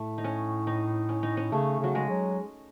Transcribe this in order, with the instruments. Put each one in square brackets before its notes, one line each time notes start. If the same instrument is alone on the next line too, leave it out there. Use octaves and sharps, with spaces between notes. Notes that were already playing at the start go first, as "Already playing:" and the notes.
Already playing: [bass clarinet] A2 [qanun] A3
[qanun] D#4
C#4
D#4
C#4
D#4
C#4
[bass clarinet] C#3 [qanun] A3
[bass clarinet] C#3 [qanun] F#3
[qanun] G#3
[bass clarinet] F#3